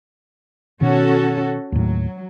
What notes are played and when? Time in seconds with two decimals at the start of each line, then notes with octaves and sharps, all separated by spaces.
0.81 B2 D#3 C#4 F#4 A4
1.72 D#2 A2 F#3